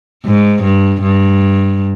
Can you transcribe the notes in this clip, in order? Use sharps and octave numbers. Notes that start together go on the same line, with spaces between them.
G#2
G2
G2